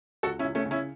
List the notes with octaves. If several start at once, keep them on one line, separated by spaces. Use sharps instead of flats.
C#2 F#4 A4
C#4 E4
C#2
A3 C#4
C#3
C#4 E4